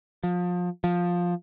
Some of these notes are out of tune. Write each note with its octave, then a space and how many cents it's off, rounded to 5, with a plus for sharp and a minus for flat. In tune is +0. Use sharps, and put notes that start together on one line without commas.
F3 +30
F3 +10